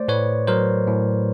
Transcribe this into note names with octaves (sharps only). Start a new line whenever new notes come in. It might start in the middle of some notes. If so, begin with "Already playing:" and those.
Already playing: A3 C5 D5
A2 B4 C#5
F#3 A#4 C5
A2